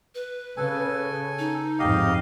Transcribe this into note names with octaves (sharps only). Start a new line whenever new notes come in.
B4
C#3 A4 G#5
D#4
F2 G#2 G4 D#5 F5